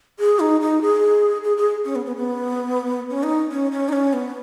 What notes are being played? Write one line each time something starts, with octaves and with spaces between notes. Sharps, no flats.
G#4
D#4
D#4
G#4
G#4
G#4
C#4
B3
B3
B3
C#4
D#4
C#4
C#4
D#4
C#4
B3